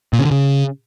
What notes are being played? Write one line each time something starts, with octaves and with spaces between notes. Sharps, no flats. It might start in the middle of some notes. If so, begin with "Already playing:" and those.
A#2
C#3
D3
C#3